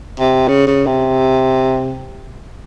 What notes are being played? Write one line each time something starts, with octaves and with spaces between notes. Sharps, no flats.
C3
C#3
C#3
C3